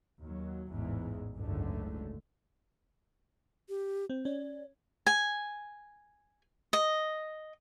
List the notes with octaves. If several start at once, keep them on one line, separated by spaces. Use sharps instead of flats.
D#2 F#3
A1 E2 G#2 E3
F#1 C#2 G#2 D3 A3
G4
C4
C#4 D5
G#5
D#5